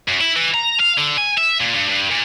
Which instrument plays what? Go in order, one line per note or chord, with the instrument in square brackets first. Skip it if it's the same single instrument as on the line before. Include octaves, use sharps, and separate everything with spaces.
[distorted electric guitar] F#2
E4
E3
A#5
F5
D3
G#5
E5
A#2
G2
G2
A#2